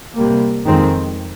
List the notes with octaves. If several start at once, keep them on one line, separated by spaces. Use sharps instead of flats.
C3 G3 A#3
F2 D#3 G#3 C4